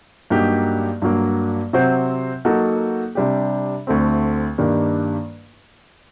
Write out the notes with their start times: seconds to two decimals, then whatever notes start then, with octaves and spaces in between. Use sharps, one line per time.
0.30 G2 F#3 A#3 D#4 G4
1.02 G2 F#3 A#3
1.73 C3 F#3 C4 F#4 C5
2.45 F#3 A#3 D#4 F#4 A4
3.15 C3 G3 D4 G4
3.87 D2 D3 A3 C4
4.58 G2 D#3 G3 A#3 D4